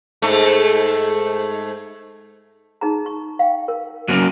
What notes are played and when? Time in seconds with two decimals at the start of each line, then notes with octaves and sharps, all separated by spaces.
0.22 G#2 A3
2.81 D#4 G#4 A#5
3.06 C#6
3.39 F5 G5
3.68 A#4
4.08 F#3 A#3 C#4